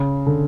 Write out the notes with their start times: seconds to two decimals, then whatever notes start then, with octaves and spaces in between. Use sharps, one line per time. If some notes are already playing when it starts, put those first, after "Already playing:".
Already playing: C#3
0.26 D3